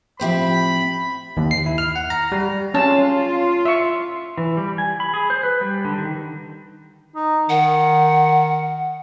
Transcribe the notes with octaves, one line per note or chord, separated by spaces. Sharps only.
A2 F3 C4 G4 C5 E5 B5
D#2
C7
E4
F6
F#5
A#5
G3
C#4 F4 A5
E5 C#6
E3
G3
G#5
B5
G#4
C5
B4
G3
D3
D#3
D#4
D#3 F#5